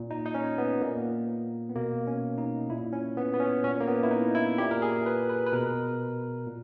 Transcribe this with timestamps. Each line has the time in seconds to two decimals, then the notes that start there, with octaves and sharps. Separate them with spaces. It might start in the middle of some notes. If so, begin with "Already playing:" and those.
Already playing: A#2
0.11 D#4
0.26 D#4
0.34 C#4
0.58 B3
0.81 A#2 A#3
1.69 B3
1.75 B2 A#3
2.07 C#4
2.38 D#4
2.70 A#2 E4
2.93 C#4
3.17 B3
3.34 B3
3.40 C#4
3.64 A#2 C#4
3.80 A#3
3.88 B3
4.03 E4
4.11 D#4
4.35 E4
4.58 A#2 G4
4.71 A#4
4.82 G#4
5.06 B4
5.29 B4
5.46 B4
5.52 B2 A#4
6.47 A#2